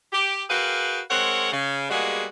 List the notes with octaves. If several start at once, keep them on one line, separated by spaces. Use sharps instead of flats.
G4
F#4 G#4 A#4 B4 F5 G5
G#3 C4 A#4 C#5 F#5
C#3
G3 G#3 A#3 B3 F#4 G#4